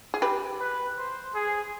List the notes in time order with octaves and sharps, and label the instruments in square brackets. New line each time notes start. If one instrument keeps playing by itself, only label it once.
[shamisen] G#4
G4 B4
[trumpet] B4
C5
G#4